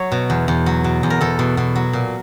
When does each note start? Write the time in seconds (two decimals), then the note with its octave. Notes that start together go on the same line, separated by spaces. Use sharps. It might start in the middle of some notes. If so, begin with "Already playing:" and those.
Already playing: F#3 C#5
0.12 B2
0.30 E2
0.48 E2
0.66 F#3
0.84 B2
1.03 E2
1.10 A#4
1.21 E2 A4
1.39 B2
1.57 B2
1.76 F#3
1.93 A#2